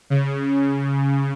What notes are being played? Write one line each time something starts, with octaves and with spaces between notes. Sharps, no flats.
C#3